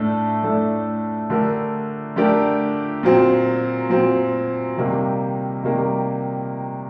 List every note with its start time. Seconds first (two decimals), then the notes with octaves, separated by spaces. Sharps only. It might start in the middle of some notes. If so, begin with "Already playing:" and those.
Already playing: A2 A3 D4 A4
0.43 A2 A3 D4 A4
1.30 D3 A3 D4 G4 A#4
2.16 D3 A3 D4 G4 A#4
3.03 A#2 F#3 C4
3.90 A#2 F#3 C4
4.77 C3 D#3 G3 A#3
5.64 C3 D#3 G3 A#3